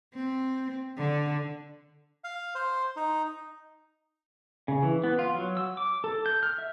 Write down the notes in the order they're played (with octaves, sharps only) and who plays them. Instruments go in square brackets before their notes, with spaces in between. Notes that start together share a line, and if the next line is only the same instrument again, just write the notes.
[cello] C4
D3
[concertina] F5
C5
D#4
[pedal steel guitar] C#3
E3
B3
F4
F#3
E6
D6
A4
G6
F6
E5